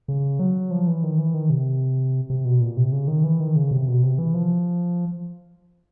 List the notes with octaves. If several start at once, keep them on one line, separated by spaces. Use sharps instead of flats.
C#3
F#3
F3
E3
D#3
E3
D#3
C3
C3
B2
A#2
C3
C#3
D#3
E3
D#3
C#3
C3
B2
C3
E3
F3